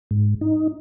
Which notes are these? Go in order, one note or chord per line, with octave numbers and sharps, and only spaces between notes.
G#2
D#4